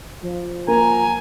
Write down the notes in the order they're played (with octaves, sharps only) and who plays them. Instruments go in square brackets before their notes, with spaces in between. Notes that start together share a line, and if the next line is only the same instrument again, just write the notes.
[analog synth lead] F3
[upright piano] A#3 [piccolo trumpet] G#5 [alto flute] A#5